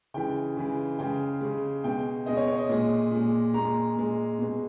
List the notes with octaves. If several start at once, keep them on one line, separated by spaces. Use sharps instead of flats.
C#3 E3 G#3 G5
C#3 E3 G#3
C#3 G#3 G5
C#3 G#3
B2 G#3 G5
B2 G#3 D#5
C#5
C#5
D#5
A#2 G#3
A#2 G#3
A#2 G#3 A#5
A#2 G#3
B2 G#3